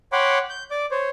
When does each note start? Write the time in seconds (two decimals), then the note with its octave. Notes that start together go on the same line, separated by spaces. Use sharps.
0.12 C#5 F#5 G5 B5 C6 D6
0.50 G6
0.71 D5 D6
0.91 C5 C#5